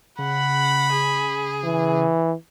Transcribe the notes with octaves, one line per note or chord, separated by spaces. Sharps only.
C#3 F#5 B5
G#4
E3